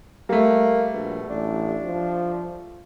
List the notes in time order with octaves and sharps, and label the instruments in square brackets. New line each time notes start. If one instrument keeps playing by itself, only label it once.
[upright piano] G3 A3 [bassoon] A#3
[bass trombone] A#1 [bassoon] B2
[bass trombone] A1 [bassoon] D4
[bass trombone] F3